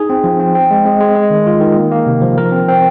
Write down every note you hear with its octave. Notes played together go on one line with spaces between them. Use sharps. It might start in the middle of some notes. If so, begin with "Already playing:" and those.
Already playing: D#4 G#4
C4
F3
C4
C4
G#3
G#3
G#3
G#3
D#3
F4
D#3
A#3
A#3
C3
F3
A#4
C4
C4